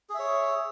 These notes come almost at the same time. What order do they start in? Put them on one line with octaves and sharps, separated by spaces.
G#4 E5 C#5